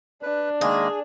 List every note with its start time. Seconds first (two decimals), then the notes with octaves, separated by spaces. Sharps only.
0.23 D4 B4
0.61 D#3 G#3 A#3 G#4